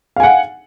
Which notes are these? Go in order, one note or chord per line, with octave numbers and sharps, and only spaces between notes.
F5 F#5 G#5